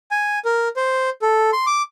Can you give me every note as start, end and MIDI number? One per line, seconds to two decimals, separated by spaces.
0.11 0.39 80
0.45 0.68 70
0.76 1.10 72
1.22 1.50 69
1.53 1.66 84
1.67 1.82 86